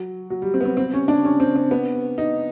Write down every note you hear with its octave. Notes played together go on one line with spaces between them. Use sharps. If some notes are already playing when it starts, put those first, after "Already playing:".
Already playing: F#3
F#3
G3
C4
B3
C4
C4
C#4
D4
C#4
C4
C4
B3
D#4